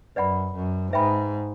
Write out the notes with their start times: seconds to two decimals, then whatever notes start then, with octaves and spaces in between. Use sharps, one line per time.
0.16 F#2 B4 D5 F#5 B5
0.54 F#2
0.93 G#2 B4 E5 G5 B5